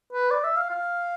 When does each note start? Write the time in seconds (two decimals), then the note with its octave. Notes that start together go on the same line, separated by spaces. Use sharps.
0.13 B4
0.31 D5
0.44 E5
0.56 F5
0.70 F5